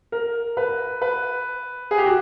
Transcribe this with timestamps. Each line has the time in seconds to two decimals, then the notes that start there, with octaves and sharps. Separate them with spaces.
0.12 A#4
0.57 B4
1.02 B4
1.91 G#4
1.98 G4
2.06 F#4